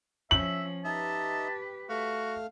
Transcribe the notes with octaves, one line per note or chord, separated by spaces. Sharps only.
F3 C#4 E5 F#7
D#4 G4 B4 D#5 E5 A5
A3 F#4 F5